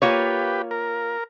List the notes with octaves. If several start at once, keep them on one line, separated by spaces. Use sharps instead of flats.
A#3 F4 G4 B4 C#5
A#4